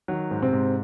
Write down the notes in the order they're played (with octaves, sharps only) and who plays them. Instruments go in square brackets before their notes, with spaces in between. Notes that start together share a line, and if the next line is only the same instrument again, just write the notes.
[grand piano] D#3 F#3
G#2
C3 C4
G#2